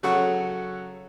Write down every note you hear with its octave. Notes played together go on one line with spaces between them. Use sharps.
C#3 F#3 F#4 A4 F#5 C#6